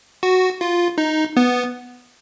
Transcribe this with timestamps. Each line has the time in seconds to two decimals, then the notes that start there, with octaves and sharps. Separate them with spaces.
0.23 F#4
0.61 F4
0.98 D#4
1.37 B3